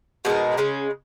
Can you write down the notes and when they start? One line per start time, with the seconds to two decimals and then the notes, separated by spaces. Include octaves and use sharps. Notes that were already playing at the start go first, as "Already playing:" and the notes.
0.25 B2 G#3 D#4 A#4
0.57 C#3 G#3 C#4